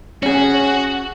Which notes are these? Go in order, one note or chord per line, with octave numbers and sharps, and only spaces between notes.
C#4 F#4 G#4